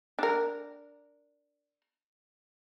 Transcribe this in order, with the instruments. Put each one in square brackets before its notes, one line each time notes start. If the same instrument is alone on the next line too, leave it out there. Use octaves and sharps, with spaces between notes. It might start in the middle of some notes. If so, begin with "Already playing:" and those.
[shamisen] D4 A#4